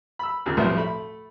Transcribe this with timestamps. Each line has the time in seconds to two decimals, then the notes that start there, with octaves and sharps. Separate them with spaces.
0.19 B5 E6
0.46 D#2 A#2 C#3
0.57 B1 F2 A2 F3 G3
0.77 A3 B5